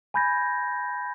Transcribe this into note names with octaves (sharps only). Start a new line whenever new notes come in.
G#5 B5 G6 G#6 A#6